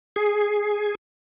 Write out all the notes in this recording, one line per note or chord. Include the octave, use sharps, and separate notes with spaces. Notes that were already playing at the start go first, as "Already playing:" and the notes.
G#4